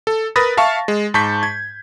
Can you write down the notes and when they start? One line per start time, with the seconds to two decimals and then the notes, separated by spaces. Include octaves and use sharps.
0.07 A4
0.36 A#4 B4 B5 D#6 A6 A#6
0.57 E5 F5 A5 C#6
0.88 G#3
1.14 G#2 A5 C#6 G6 B6
1.43 G#6